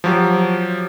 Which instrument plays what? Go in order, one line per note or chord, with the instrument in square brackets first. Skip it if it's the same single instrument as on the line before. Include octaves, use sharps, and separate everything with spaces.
[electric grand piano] F3 F#3 G4